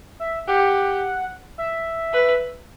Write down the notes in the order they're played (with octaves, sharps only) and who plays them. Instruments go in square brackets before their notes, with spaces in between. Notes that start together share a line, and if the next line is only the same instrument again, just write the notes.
[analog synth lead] E5
[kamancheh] G4 [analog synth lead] F#5
[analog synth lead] E5
[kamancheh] B4